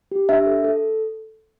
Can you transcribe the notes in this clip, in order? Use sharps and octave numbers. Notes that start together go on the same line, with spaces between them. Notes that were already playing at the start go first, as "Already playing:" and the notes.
G4
D4 E5
A4
A4